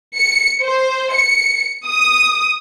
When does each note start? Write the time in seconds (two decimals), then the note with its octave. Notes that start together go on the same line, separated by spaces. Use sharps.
0.15 C#7
0.62 C5
1.14 C#7
1.87 D#6